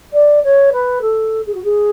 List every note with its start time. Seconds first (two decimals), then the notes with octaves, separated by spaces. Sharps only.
0.13 D5
0.43 C#5
0.72 B4
1.01 A4
1.46 G#4
1.54 F#4
1.63 G#4